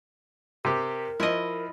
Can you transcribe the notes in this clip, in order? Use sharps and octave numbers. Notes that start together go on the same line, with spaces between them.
C3 G4 A#4
F3 E4 D#5